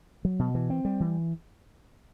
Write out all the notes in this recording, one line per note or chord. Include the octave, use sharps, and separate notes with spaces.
F#3
B2
E3
C4
G3
E3